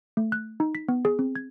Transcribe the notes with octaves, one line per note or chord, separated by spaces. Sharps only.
A3
F#6
D#4
B6
B3
G#4
C4
G#6